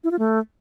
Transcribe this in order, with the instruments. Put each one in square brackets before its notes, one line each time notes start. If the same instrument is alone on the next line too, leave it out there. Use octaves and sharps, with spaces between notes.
[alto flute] E4
F4
A3